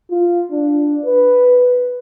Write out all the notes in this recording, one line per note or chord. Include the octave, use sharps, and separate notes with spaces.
F4
D4
B4